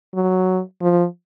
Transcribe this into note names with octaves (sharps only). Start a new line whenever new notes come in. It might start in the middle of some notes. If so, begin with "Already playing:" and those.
F#3
F3